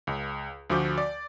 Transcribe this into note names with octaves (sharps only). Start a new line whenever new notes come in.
C#2
D2 F3 F#4 D6 G6
D5